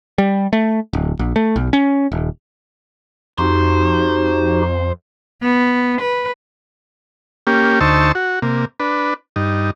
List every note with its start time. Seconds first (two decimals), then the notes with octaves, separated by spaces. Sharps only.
0.18 G3
0.53 A3
0.93 D1
1.19 A#1
1.36 A3
1.56 B1
1.73 C#4
2.12 D#1
3.38 F2 D#4 F#4 G4 C5
5.42 B3
6.01 B4
7.47 A#3 C#4 G4
7.81 D2 D#4 C5 A5 C#6 E6
8.15 F#4
8.42 C3 A#3
8.80 D4 B4
9.36 G2 D#4